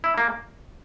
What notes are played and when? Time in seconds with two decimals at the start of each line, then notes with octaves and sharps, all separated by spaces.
0.04 E4
0.18 A#3